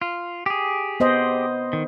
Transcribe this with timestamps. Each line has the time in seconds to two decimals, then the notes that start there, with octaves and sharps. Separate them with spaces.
0.02 F4
0.46 G4 G#4
1.00 B3 C5 D#5
1.73 D#3